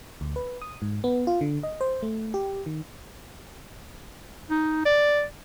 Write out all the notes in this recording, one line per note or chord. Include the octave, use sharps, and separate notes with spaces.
D2
B4
D#6
G#2
B3
F4
D3
D#5
C5
A3
G4
D#3
D#4
D5